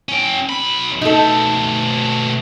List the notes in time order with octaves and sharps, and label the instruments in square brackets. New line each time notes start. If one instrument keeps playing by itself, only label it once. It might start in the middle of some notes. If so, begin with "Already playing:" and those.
[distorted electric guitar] C#4 G5
B1 B5
[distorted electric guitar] B2 A3 [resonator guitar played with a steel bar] D#4 A4